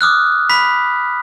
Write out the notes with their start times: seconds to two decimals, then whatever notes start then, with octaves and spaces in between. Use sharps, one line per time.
0.01 D6 D#6 F6 F#6
0.49 B5 B6